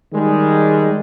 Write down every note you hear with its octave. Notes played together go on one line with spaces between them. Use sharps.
D#3 G3 G#3